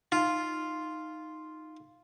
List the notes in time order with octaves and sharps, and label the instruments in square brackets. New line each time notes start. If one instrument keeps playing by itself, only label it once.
[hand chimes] D#4 [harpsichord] F4